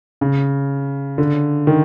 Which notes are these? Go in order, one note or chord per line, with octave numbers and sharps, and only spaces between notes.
C#3
D3
D#3